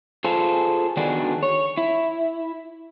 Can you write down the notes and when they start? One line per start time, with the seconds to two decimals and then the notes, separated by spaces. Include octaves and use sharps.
0.24 F4 G#4 A4 C5
0.97 D3 D#3 B3 D4 F#4 G#4
1.43 C#5
1.77 E4